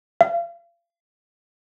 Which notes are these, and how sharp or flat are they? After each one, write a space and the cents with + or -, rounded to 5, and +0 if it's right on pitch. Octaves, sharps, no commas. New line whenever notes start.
F5 -35